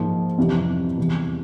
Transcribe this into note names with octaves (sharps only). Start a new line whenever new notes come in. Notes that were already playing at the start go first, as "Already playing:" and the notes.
Already playing: G#2 F3 A#3
F2 C3 E3 G3
E2 C3 E3 G3